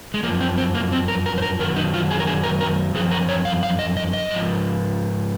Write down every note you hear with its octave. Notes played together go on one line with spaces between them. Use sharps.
G#3
F#2 F3 A#3
C4
C4
A#3
C4
A#4
A#4
C5
A#4
F#2 D#3 F#3 A#4
D#4
F4
G#4
A#4
G#4
A#4
A#4
F#2 F3 G#4
A#4
C#5
F5
F5
D#5
D#5
D#5
G#2 F3